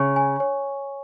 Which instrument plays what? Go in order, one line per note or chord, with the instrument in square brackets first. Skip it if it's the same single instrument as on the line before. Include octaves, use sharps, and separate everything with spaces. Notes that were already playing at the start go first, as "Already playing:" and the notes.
Already playing: [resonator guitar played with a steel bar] C#3 [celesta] C#5 C#6
[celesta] G#5
C#5